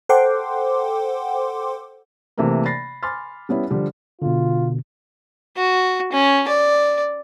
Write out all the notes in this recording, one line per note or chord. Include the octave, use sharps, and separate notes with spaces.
A4 C5 F#5 G5 C6 D6
C3 E3 A3 A#3 A#4
B5 A6 A#6 C7
G#5 B5 C6 D6 F6 A6
G3 B3 C#4 E4
D3 F3 G3
B2 D3 F4
F#4
C#4
D5